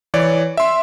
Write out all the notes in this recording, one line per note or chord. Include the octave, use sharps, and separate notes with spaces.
E3 C#5 D5
E5 C6